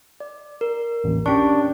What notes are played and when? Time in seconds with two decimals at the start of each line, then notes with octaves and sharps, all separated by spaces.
0.20 D5
0.61 A#4
1.04 A1 D#2
1.26 C#4 D4 G4 C#6